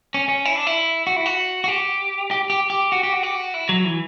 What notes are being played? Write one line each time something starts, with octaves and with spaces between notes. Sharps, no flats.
C#4
C#4
E4
D4
E4
F#4
E4
F#4
F#4
G4
G4
G4
G4
F#4
G4
F#4
G4
F#4
E4
F#3
E3